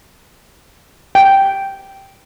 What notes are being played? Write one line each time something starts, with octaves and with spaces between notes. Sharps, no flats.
G5